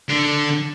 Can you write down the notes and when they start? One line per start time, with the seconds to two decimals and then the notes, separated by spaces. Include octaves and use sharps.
0.09 D3